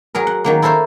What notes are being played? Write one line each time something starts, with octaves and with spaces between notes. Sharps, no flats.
F#3 G#4 A#4
F#5
D#3 F#3 A#3
E4 A4 A#4 C5 C#5